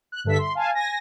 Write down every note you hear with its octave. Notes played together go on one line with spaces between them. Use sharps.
F#6
G2 D3 A4 E5 B6
C6
F5 G#5 A5
G#5 A#6